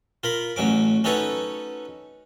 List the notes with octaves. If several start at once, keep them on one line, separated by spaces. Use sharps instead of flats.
F4 A#4 B5
A1 F#3 C#4 D6
C#4 D#4 F#4 A4 B4 C#5